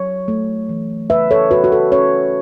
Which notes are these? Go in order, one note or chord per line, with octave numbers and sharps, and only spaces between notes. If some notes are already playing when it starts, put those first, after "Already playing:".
Already playing: F#3 C#5
A3
E3
C#3 B4 E5
A4 C#5
C#3 F#4 B4
F#4
A4
C#4 A4 C#5